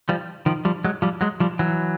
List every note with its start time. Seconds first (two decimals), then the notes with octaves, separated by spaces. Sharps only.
0.09 F3 G3
0.46 D#3 F3
0.65 F3 G3
0.84 F#3 G#3
1.02 F3 G3
1.21 F#3 G#3
1.40 F3 G3
1.59 E3 F#3